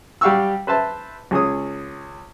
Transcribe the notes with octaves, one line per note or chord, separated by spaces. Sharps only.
G3 G4 F5 F#5 C#6 E6
B4 C5 E5 A5
C#2 G#4 C#5 D#6